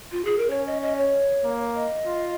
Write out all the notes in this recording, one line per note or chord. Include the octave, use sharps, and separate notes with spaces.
F4
G#4
A#4
C#4 C#5
D#5
D#5
C#5
A#3
D#5
F4